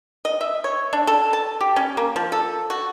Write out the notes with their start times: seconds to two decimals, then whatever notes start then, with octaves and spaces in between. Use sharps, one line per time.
0.25 D#5
0.41 E5
0.64 C#5
0.93 D4
1.07 A4
1.33 A5
1.61 G4
1.76 C#4
1.97 A#3
2.16 F3
2.32 A4
2.70 F#4